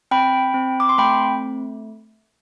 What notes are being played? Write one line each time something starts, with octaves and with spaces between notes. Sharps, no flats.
C4 G5 B5
C4
D6
C6
A3 G5 B5